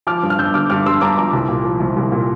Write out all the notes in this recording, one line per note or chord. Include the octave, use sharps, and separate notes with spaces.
F3 D6 F6
G2
F6
G2 E6 G6
D3 D6 F6
G2 D6 F6
G2 C6 E6
G2 A#5 D6
F3 A#5 D6
C2
A#2
F3
C2
C2
A#2